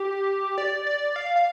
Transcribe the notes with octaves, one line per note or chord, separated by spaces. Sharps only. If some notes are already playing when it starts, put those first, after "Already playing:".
Already playing: G4
D5
D5
F5
F5